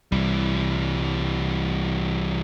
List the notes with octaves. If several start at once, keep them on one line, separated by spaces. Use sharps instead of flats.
C2 E3 G3